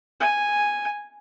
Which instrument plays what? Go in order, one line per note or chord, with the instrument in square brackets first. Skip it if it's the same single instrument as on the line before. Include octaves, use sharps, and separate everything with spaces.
[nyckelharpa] G#5